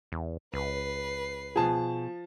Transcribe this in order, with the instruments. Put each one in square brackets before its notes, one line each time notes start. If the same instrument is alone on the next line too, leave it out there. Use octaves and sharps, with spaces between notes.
[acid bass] E2
[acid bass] C#2 [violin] B4 C7
[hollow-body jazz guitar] B2 G#4 [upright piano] F3 A5